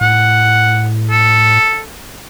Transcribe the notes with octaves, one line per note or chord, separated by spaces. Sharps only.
A2 F#5
A4